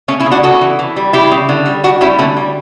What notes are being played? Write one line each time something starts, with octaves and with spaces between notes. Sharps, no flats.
C#3 A3 C#4
C#4 E4
C#3
D4 F#4
C#3 F#4 A4
E3
E3
G3
C#3 E4 G4
C#3
D3
G3
G3 D4 F#4
G3 C#4 E4
D3 A3 C#4
G3